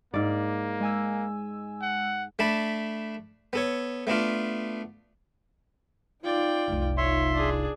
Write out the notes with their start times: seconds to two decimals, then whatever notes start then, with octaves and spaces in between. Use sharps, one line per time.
0.14 G#2 A#3 D5
0.80 G#3 G#5 E6
1.82 F#5
2.39 A3 D4 A5 B5
3.53 B3 A4 C#5
4.07 A3 B3 D4 F4
6.24 D#4 F4 D5 G5
6.68 F1 C2
6.97 D#4 F4 C#5 E5 C6
7.34 D4 G#4